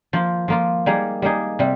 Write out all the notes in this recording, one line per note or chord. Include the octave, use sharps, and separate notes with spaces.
F3 A#3 F4
F3 A#3 F4
G3 A#3 D#4 G#4
G3 A#3 D#4 G#4
C3 G3